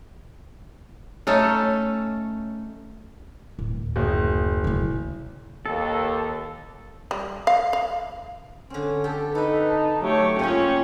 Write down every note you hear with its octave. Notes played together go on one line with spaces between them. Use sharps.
A3 C#4 D#4 A4
D1
F#1
C#3 E4
D#2 A4
G3
F5
F5
D3 C4 C#4
G4 A4 G5
D#4 A4 B4 E5
A5
F#3 A3 G4 C#5
G#2 A#3 C#4 E4 F4 G#4 G5